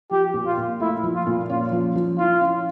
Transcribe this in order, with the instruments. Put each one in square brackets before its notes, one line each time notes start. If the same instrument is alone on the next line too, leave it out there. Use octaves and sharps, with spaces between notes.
[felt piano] F3 [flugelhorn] G4
[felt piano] A#2
[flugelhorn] F4
[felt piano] A#2
[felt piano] A3 [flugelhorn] E4
[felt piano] F3
[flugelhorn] F4
[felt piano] A#2
[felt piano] C#4 [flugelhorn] F4
[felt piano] F3
F3
[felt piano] E4 [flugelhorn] F4
[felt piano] C#4